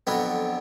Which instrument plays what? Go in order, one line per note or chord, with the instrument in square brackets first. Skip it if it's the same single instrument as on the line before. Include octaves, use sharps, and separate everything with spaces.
[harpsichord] F2 D3 F#3 B3 B4